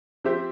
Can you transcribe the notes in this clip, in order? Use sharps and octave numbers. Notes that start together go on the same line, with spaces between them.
F3 C4 G4 C5 E5